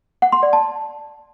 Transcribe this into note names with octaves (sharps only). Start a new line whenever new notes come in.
F#5
C6
D5
A5